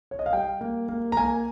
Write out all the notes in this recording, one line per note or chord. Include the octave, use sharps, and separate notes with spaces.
C#5
D#5
F5
G3 G5
A#3
A#3
A#5
A#3 G#5